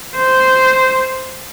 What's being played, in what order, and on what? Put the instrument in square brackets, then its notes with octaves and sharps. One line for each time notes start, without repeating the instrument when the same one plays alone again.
[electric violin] C5